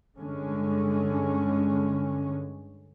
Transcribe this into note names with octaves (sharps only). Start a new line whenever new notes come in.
G2 D3 G#3 C#4